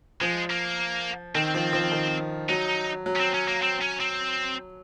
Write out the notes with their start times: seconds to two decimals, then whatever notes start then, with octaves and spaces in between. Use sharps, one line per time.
0.21 F3 G#3
0.50 A#3
1.35 D#3 C4
1.54 F3
1.73 F3
1.91 D#3
2.49 F#3 D#4
3.06 F#3
3.16 C#4
3.20 C4
3.34 C#4
3.48 A#3
3.63 C4
3.82 C#4
4.01 C4